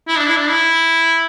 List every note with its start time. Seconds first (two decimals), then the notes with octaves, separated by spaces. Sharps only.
0.08 E4
0.19 D4
0.27 E4
0.37 D4
0.50 E4